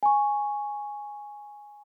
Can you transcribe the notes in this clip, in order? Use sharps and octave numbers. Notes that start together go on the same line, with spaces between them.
G#5 C#6